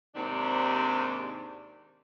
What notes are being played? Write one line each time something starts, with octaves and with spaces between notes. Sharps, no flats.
D#2 G#2 C3 D4 G4 D5